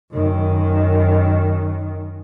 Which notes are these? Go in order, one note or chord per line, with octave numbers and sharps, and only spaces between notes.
F#2 D#3